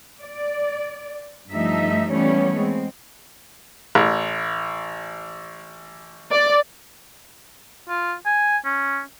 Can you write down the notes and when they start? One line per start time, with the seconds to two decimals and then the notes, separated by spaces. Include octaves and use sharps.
0.21 D5
1.50 G2 F3 A3 D#4 E5
2.10 E3 G3 A3 B3 C#4 C#5
2.55 G#3 C4
3.95 A1
6.31 D5
7.89 F4
8.26 G#5
8.65 C#4